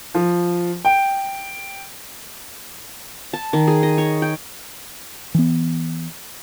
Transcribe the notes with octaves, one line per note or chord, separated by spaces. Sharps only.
F3
G5
A5
D#3
G#4
D#5
C#5
G5
E3 B3